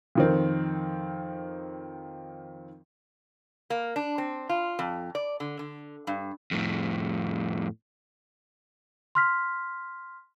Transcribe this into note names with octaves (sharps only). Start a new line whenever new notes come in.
F2 D#3 C4
A#3
D4
C4
F4
F2
D5
D3
D3
G2
F2 A2
C6 F6 B6